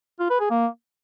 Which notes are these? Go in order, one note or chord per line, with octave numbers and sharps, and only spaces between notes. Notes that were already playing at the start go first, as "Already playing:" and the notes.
F4
B4
G#4
A#3